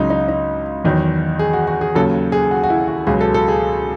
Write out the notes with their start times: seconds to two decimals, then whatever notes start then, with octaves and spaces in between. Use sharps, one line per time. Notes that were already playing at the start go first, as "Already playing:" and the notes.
Already playing: C#2 C#3 F#3 D#4
0.10 D#4
0.28 D#4
0.84 E2 D#3 F#3
1.39 G#4
1.53 F#4
1.67 F#4
1.81 G#4
1.95 D#2 C#3 F#3 A4
2.32 G#4
2.51 F#4
2.63 F#4
2.70 E4
2.88 F#4
3.07 C#2 B2 F#3 G#4
3.21 A4
3.34 A4
3.48 G#4